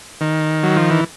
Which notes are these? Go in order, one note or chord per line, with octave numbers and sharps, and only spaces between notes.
D#3
F#3
F3
E3